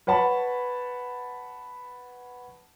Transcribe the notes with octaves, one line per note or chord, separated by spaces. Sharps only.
B4 C#5 F#5 A5 B5